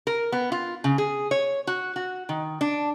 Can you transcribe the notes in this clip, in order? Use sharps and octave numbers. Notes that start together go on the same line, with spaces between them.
A#4
B3
F4
C#3
G#4
C#5
F#4
F#4
D#3
D4